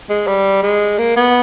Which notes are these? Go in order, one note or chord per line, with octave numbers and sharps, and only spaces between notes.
G#3
G3
G#3
A#3
B3